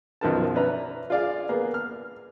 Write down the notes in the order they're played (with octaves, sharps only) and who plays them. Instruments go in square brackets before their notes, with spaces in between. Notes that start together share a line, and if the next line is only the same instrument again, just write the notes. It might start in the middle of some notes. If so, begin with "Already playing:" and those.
[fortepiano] B1 F#2 D#3 F3 A#4 A5
C#4 D4 B4 E5 A#5
F4 G#4 D5 F5
A#3 B3 G#4
F6